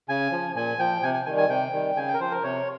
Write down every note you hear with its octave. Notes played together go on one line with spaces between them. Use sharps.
C#3 G#5
F3
A#2 G#5
F3 G5
C3 G#5
G#5
D#3 G3 G#5
G#5
C3 G5
D#3 G3
C#3 G#5
G5
A#4
F3 C5
A#4
C3 C#5